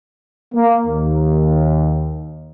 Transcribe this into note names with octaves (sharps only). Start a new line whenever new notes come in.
A#3
D#2